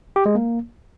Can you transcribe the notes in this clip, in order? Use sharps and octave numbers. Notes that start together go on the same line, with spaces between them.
G4
G#3
A#3